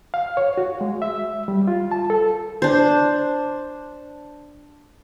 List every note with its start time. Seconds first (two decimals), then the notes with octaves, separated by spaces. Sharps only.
0.14 F5
0.37 C#5
0.58 F#4
0.81 G#3
1.02 E5
1.48 G3
1.68 F4
1.92 A5
2.10 A4
2.62 D4 C5